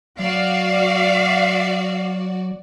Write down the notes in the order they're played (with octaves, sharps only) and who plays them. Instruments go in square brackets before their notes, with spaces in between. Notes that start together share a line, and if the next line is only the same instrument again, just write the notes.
[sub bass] F#3 [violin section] F#4 D5 [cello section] F5